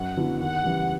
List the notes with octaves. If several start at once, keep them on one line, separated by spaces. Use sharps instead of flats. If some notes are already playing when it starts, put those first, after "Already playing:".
Already playing: F#2 F#5
D3 F#3 B3 E4
D#2 F#5
C#3 E3 G3